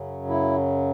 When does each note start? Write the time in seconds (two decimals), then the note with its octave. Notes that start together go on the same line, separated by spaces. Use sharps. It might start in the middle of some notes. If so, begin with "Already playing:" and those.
Already playing: F#2 C#3 F#3
0.29 E4